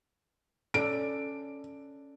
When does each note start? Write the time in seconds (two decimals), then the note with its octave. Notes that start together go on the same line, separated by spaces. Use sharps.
0.74 C#4 A4 D5 D7